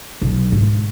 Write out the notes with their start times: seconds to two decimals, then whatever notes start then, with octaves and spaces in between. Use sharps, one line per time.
0.22 B1
0.52 G#2